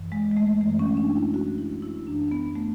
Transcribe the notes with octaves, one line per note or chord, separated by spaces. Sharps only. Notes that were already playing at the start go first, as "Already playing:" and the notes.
Already playing: F#2 E3
G#3
G#3
A3
F#2 E3 A3
C#4
D4
E4
F#4
E4
E4
F#2 E3 D4
B3
A3